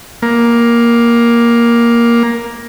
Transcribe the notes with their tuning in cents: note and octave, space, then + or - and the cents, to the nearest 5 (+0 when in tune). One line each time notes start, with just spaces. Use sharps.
A#3 +10